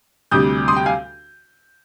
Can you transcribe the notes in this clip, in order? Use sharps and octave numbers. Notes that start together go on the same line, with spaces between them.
D2 C3 G3 D#6 G6
C6 D#6
G5
F5 G#5